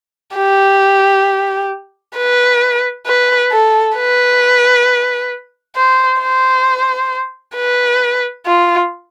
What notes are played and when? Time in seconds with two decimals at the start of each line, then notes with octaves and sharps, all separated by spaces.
0.36 G4
2.17 B4
3.07 B4
3.52 A4
3.96 B4
5.76 C5
6.21 C5
7.56 B4
8.46 F4